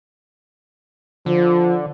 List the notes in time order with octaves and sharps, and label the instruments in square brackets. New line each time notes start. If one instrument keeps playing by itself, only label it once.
[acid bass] D3 [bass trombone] F3